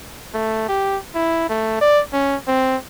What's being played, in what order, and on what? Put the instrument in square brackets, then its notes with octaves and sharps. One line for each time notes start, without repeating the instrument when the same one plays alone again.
[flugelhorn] A3
G4
E4
A3
D5
C#4
C4